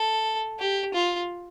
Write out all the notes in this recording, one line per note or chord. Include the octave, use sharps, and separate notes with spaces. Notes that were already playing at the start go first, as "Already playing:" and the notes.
Already playing: A4
G4
F4